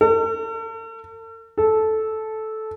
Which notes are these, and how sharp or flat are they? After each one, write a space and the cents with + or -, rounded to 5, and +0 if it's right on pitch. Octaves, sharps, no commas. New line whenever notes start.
A4 +45
A4 -10